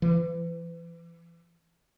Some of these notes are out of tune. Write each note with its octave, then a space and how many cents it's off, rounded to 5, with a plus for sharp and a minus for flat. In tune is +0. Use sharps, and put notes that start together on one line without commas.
E3 +35